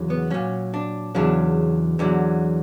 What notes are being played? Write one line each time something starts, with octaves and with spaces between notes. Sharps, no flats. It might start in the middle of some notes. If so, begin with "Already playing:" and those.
Already playing: E2 C#3 F#3
B3
A#2 F#3 C#4
D4
E2 C#3 F#3 D4
E2 D3 F#3